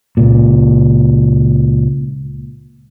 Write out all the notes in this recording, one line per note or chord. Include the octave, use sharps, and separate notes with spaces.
C#2 A#2